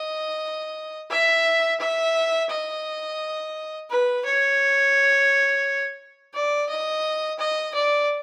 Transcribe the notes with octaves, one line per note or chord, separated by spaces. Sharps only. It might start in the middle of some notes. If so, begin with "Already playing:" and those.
Already playing: D#5
E5
E5
D#5
B4
C#5
D5
D#5
D#5
D5